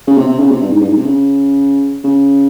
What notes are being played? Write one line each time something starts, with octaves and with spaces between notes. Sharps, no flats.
C#3
C3
C3
C#3
C3
G2
G#2
G2
G#2
C3
C#3
C#3